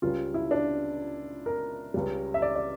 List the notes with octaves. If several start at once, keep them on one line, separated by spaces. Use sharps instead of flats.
C#2 C#3 G3 F4
E4
D4
A#4
C#2 C#3 G3
E5
D5
D5